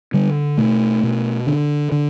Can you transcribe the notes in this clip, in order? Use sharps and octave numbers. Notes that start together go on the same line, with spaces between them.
D3 G3
B2 A3
B2
D3
D3